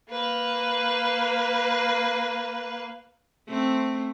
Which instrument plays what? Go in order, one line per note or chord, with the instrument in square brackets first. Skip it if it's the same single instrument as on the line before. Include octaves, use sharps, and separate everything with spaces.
[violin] A#3 B4
[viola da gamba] A3 C4